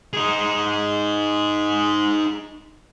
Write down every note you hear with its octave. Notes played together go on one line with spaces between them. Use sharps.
D#4 G#4